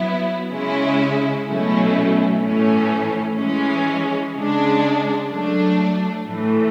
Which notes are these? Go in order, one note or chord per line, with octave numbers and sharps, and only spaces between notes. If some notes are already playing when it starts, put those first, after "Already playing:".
Already playing: F#3 B3 E4
C#3 G#3 C#4 E4
B2 F#3 A3 C#4 E4
A2 E3 A3 C#4
E3 G#3 C#4
C#3 G#3 D4
F#3 A3 D4
A2 E3 A3